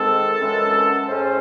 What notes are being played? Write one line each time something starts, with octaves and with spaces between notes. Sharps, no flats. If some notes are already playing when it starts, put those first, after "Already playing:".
Already playing: G#2 D#3 G#3 C4 A4
F#2 E3 G#3 C#4
A2 G#3 C#4 C5